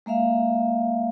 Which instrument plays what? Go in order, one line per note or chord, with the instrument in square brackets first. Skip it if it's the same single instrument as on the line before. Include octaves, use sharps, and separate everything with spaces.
[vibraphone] G#3 A#3 E5 F5